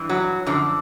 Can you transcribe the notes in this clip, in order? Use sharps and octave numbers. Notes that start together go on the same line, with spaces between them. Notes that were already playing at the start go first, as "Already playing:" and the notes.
Already playing: G2 E3
F#3
F#2 D3 F3